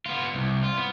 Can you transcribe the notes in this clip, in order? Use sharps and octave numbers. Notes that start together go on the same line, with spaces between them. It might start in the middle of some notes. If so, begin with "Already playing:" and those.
B3 F4
C2
F4
B3